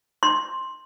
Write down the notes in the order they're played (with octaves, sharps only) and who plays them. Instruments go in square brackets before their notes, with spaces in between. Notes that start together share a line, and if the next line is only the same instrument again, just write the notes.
[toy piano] C6